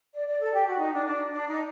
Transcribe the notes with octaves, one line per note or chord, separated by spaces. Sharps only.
D5
D5
A4
G4
F#4
D#4
D4
D4
D4
D#4